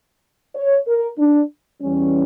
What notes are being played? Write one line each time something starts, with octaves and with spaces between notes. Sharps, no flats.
C#5
A#4
D4
E2 E3 G3 C#4